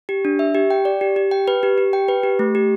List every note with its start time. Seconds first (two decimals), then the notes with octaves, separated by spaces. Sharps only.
0.09 G4
0.25 D4
0.39 E5
0.55 G4
0.70 G5
0.85 D5
1.01 G4
1.16 G4
1.31 G5
1.48 B4
1.63 G4
1.78 G4
1.93 G5
2.08 B4
2.23 G4
2.39 A3
2.55 G4